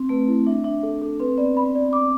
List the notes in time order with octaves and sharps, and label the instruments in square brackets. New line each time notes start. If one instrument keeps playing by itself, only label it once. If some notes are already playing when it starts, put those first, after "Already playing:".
Already playing: [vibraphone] C4
[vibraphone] A3 [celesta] B4
[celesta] E4
[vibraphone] D4 [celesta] E5
[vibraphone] D4 [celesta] E5
[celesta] A4
A4
[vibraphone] C4 [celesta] B4
[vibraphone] B3 [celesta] D5
[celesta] B5
D5
D6